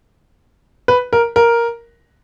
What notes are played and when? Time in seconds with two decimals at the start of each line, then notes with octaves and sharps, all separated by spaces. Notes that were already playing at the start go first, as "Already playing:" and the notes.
0.88 B4
1.13 A#4
1.36 A#4